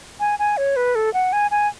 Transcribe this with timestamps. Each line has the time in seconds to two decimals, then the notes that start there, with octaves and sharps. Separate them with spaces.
0.20 G#5
0.39 G#5
0.57 C#5
0.76 B4
0.95 A4
1.14 F#5
1.33 G#5
1.51 G#5